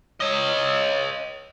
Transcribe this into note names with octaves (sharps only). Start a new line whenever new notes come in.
C#5 D#5